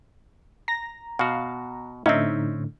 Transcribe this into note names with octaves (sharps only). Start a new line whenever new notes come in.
A#5 A#6
B2 F#4 F5
A2 D3 C4 C#4 D#4 E5